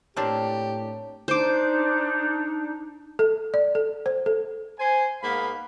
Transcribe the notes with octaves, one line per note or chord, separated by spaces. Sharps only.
A2 A#3 C4 D4 G4 C#5 A5
D4 D#4 C5 D6
A4
D5
A4
C5
A4
C5 G#5
G#2 A#3 B3 F5 B5